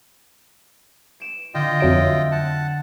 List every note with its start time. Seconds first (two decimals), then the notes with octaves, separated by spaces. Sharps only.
1.20 D7 E7
1.54 D3 F4 D#5 G5
1.80 F2 F#3 E5 D7
2.31 F#5 A5